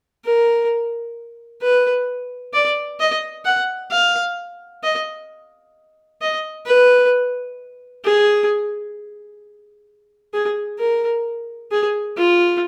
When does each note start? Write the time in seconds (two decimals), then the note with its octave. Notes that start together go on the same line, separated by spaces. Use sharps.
0.25 A#4
1.62 B4
2.53 D5
3.00 D#5
3.45 F#5
3.91 F5
4.84 D#5
6.22 D#5
6.66 B4
8.04 G#4
10.34 G#4
10.79 A#4
11.71 G#4
12.17 F4